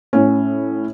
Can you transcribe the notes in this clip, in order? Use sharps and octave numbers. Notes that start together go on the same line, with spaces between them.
A2 C#4